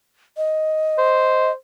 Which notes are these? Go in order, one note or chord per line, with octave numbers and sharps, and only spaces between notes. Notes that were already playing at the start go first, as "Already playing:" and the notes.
D#5
C5